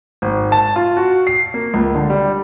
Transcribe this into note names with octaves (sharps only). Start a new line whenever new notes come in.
G#1
A5
F4
F#4
C7
A#3
C#2
D3
G3